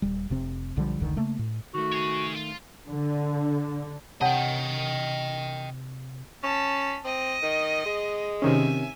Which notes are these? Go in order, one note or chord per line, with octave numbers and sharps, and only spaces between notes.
D#1 G3
F1 C3 C4
B1 D3 F3 G3
F1 C#2 D3 D#3
C#3 A3 A#3
A2
D#3 A3 F#4
G#4 C#5
F4
D3
C3 C#5 D#5 F#5 G5 A5
C#4 A5 B6
C4 D#5
D#3
G#3
C3 D#3 C#4 E5 G#5